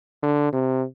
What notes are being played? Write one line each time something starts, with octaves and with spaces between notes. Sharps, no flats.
D3
C3